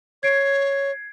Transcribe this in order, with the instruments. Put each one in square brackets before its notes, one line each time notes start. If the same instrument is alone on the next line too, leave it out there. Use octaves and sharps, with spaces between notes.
[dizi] C#5 [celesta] G#6 C7 D7